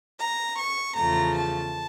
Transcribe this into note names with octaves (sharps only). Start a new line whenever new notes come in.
A#5
C#6
E2 C#3 F3 A3 A#5
A5